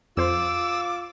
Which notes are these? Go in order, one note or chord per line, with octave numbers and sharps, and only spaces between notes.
F2 F4 C5 D6 E6